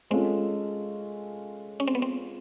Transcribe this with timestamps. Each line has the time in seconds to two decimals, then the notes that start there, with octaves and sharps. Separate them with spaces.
0.10 G#3 C4 C#4 F4 A4
1.80 C#4
1.87 C4
1.95 B3
2.02 C4